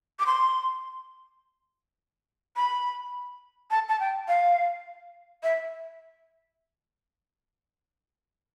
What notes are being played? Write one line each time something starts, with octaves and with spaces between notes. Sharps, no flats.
D6
C6
B5
A5
A5
G5
F5
E5